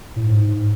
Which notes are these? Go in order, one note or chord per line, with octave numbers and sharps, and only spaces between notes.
A2
G#2